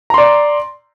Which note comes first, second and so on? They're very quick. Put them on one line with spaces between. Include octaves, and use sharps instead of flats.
A#5 C6 D5